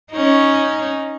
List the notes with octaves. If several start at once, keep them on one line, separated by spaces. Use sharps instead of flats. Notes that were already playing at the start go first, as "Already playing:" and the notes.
C#4 D#4